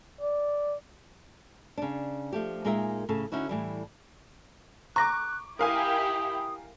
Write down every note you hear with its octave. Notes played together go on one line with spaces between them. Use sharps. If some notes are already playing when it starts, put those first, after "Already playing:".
D5
C#3 D4
F3 A3 G4
A#2 G#3 D#4 G#4 A#4 E5
A2 C#3 A4
D3 C#4 D#4 E4 F#4
A2 E3 G3
A#5 C#6 D6 F#6 A#6
E4 G4 A#4 F5 G#5 D#6